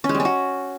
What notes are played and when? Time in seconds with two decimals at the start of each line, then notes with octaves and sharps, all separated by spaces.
0.04 C#4
0.09 G#3
0.15 G3
0.20 C#4
0.25 F#4